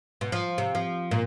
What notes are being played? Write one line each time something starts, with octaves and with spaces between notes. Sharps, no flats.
B2
F3
C3
F3
A#2